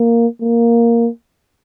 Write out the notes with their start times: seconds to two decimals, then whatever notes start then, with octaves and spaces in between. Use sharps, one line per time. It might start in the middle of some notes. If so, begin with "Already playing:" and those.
Already playing: A#3
0.42 A#3